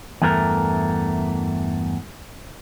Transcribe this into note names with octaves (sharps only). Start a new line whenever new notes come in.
E2 G2 E3 A3 A#4